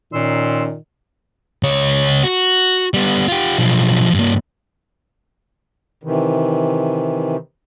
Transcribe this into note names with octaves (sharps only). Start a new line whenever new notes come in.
A#2 D#3 C#4 C6 E6
C#2 C#5
F#4
G3 B3
F4 G4
B1 F3
G2 A#3
C3 D#3 E3